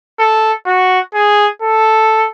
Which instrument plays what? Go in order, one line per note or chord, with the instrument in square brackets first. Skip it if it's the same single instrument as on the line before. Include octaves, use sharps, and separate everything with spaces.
[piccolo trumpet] A4
F#4
G#4
A4